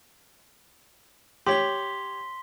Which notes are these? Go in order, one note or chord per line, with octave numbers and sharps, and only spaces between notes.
G4 C#5 C6 B6 G7